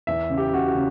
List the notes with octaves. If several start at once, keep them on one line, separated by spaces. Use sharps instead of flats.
E2 E5
C#3
G4
C#3 F#4
F#4
C#3